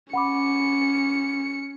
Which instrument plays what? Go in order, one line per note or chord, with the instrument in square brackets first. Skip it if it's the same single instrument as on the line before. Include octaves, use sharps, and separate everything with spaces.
[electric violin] C#4 C#7 [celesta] F#5 B5 D6